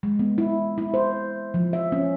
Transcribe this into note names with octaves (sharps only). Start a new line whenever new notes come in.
G#3
B3
E4
E4
C5
F3
E5
C#4